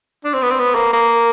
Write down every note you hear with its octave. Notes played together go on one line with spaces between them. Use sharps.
D4
C4
B3
C4
B3
A#3
A#3